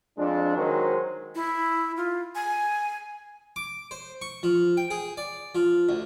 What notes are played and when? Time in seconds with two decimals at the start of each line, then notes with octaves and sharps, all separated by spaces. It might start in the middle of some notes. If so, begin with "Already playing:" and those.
0.18 F2 G#3 D4
0.56 D#3 F#3 G#3 C5
1.35 E4
1.97 F4
2.35 G#5
3.56 D6
3.91 C5
4.22 C#6
4.43 F3
4.77 G5
4.91 G#4
5.17 D5
5.55 F3
5.89 D2